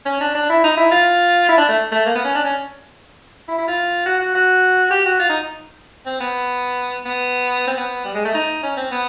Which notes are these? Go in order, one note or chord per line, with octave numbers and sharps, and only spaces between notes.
C#4
D4
D4
E4
D#4
E4
F4
E4
D4
A3
A3
A#3
B3
C#4
D4
C#4
E4
E4
F4
F#4
F#4
F#4
G4
F#4
F4
D#4
C4
B3
B3
C4
B3
G3
G#3
A3
D#4
C#4
C4
B3